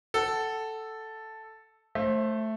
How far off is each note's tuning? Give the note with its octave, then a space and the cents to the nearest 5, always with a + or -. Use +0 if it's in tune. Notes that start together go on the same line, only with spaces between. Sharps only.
A4 +0 F#5 +25
A3 +0 C5 +30